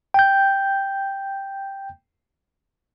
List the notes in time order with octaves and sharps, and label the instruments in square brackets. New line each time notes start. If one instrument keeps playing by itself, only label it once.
[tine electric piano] G5 G6